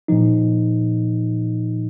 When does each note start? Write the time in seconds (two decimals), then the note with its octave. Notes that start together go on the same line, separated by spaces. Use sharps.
0.08 A#2 F3 D#4